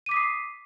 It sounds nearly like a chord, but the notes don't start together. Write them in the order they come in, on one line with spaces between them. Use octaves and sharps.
D#7 D6 B6 D#6 C7